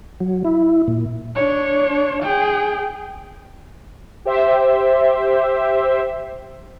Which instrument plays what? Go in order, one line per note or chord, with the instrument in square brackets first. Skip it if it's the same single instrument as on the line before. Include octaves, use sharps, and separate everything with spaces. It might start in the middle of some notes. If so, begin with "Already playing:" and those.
[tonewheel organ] F#3
E4
A#2
[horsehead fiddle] D4 C#5
G#4 G5
[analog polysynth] G4 C5 E5